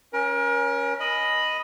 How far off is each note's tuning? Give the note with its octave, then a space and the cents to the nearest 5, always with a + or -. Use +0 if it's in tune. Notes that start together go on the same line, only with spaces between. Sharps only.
C#4 +0 A#4 +35
D#5 +0 B5 +0